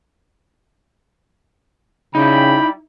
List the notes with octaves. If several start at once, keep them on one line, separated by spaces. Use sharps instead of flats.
C#3 G3 D#4 E4 G5 B5